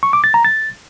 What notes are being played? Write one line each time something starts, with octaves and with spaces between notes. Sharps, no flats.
C#6
D6
A6
A#5
A6